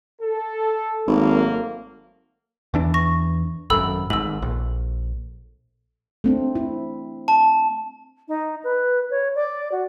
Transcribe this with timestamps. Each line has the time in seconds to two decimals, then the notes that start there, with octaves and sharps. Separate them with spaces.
0.21 A4
1.08 G#1 F#3 A3 A#3
2.74 E2 E3 D4
2.94 C#6 A#6
3.70 G#1 F#2 A4 B5 E6
4.10 G#1 G#2 E6 F#7
4.42 A#1
6.24 A3 C4 D4
6.55 E4
7.28 A5
8.28 D#4
8.64 B4
9.11 C#5
9.35 D5
9.72 F#4